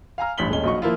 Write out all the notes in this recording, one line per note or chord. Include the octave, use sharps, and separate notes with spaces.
F5 G#5 A#5 F6
A1 G2 B6 F#7 G7
D#1 G#3 C#4 G7
A#1 F#3 D#4 D#5 C#6
F3 A#3 E4 F4